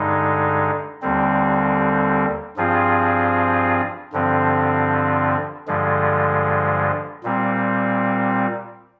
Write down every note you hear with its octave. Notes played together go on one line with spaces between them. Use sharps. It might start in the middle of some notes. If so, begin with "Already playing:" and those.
Already playing: G2 D3 G#3 D#4
D#2 D3 G3 C4
G2 F3 C4 F4 G#4
G2 D3 F3 C4
G2 D3 F3 G#3
A#2 G3 C4